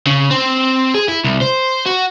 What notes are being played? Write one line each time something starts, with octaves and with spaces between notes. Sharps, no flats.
C#3
C4
G#4
E4
C2
C5
F#4